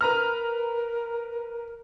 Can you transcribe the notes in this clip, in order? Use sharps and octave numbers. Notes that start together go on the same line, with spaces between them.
A#4 B4 A#5 F6